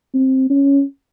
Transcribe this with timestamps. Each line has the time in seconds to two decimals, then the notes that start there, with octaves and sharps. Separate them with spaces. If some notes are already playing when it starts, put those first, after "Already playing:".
0.14 C4
0.50 C#4